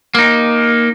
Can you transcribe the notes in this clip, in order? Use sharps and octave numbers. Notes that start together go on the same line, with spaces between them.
A#3 D#4